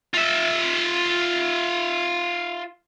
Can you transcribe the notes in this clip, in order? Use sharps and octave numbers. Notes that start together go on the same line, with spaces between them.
F4 E5